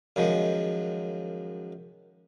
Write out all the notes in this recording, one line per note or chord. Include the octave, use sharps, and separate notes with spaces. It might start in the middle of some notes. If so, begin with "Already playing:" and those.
F#2 D#3 F3 G#3